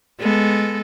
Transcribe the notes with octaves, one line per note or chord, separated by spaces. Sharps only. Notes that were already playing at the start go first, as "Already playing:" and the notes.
G#3 B3 A4